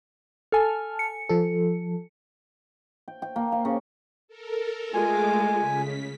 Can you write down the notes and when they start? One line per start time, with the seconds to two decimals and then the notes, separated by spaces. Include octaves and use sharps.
0.52 A4 G#5 A5 F6
0.99 C#7
1.29 F3 A4
3.08 G5
3.22 G5
3.36 A#3
3.52 F5
3.65 C#3
4.28 A4 A#4
4.94 G#3 A3 F4 G#5 D6
5.55 C#3 B6